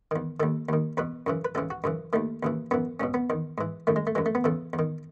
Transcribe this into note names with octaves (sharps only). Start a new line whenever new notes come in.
E2 D#3
D#2 D#3 A4
D#2 D#3
E2 B2 B4
F#2 C#3 E3
B4
C#2 C#3 E3 A4
F#4
F#2 C#3 E3
D#2 D#3 A3
D#2 C#3 E3
F#2 E3 B3
C#2 B2 C#4
B3
E2 D#3
G#2 E3
F#2 D#3 A3
G#3
A3
F#2 E3 G#3
A3
B3
E2 C#3 E3 A4
E2
D#3